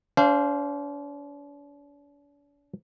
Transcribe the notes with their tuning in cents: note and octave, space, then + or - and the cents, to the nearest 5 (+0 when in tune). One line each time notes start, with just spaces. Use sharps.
D4 -45 C5 +0 F5 -25